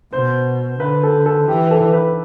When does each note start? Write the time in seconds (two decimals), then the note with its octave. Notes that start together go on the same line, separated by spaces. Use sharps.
0.12 B2 C5
0.80 D3 B4
1.03 A4
1.26 A4
1.48 E3 G4
1.71 A4
1.93 B4